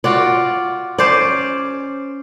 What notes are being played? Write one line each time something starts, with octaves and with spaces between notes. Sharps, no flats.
F4 F#4 D5
C#4 C5 D5